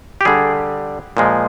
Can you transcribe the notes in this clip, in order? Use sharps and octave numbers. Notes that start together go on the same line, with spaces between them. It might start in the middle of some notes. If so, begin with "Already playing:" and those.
G4
D3 G3 G#4
A#2 F3 G#3